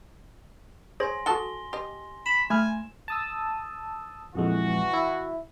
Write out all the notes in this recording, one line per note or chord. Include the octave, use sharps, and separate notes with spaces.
G#4 C5 C#5 G#5 C6 A#6
F#4 G#4 A4 F#5 A5 G7
G4 D#5 C6
B5 E7
A3 G#5 B5 F6
A5 D#6 E6
A#1 F2 E3 G#3 F#4
E4